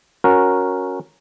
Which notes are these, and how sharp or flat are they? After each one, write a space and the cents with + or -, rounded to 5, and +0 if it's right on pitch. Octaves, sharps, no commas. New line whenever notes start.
C#4 +0 F#4 -10 A#4 +0